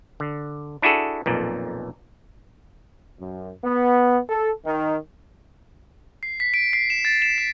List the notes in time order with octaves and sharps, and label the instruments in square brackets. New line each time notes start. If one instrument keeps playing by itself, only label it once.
[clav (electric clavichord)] D3
D4 E4 F#4 G#4 A4
B1 F2 A#2
[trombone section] F#2
B3
A4
D#3
[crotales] C7
B6
D7
C7
E7
A6
E7
B6